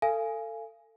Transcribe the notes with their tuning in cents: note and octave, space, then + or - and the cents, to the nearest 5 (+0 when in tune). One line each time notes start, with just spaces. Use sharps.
A4 +25 F5 -30 G#5 +5